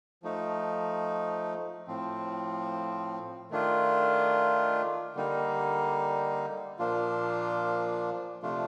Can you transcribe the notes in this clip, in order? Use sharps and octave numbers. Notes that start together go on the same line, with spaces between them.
F3 A3 D#4
A2 F3 C4
D#3 A3 D4 F4
D3 G3 A#3 D#4
A#2 F3 A#3 D4 F4
C3 F3 A3 D4 F4